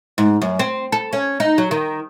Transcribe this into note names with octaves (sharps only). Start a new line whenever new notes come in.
G#2
F#2
C4
A4
C#4
D#4
F#3
D#3